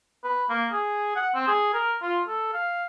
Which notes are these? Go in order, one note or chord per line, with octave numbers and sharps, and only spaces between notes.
B4
A#3
G#4
F#5
C4
G#4
A#4
F4
A4
F5